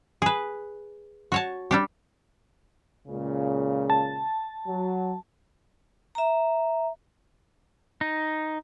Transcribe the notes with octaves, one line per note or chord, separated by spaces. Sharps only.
G#4 B4
F#4 C#5 A5
G3 D4 G4
C#2 A#2 C#3
A5
F#3
E5 A#5
D#4